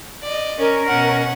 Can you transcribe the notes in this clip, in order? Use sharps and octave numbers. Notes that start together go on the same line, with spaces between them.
D5 D#5
C#4 A#4
B2 C#4 F#5